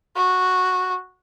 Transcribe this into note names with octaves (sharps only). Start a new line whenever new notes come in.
F#4